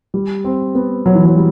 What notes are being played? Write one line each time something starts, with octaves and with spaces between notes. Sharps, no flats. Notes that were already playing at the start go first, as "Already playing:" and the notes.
G3
C4
B3
F#3
E3
F#3
G3